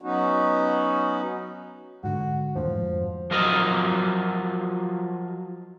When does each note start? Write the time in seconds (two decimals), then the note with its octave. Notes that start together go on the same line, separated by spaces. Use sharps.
0.01 F#3 B3 C#4 D#4 F#4
2.04 G#2 D3 F#4
2.56 D#2 A2 D3 F3
2.67 F2 G#2
3.31 F3 F#3 F4 A#4 D#5 F5